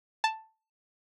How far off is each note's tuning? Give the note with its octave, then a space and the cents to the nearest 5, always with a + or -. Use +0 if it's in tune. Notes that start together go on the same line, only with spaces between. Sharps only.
A5 +5